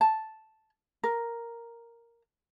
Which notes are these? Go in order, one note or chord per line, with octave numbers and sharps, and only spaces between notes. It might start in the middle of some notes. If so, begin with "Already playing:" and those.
A5
A#4